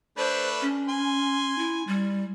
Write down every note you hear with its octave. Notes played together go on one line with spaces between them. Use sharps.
A3 D4 B4 C5
C#4
G#5 C6
E4
G3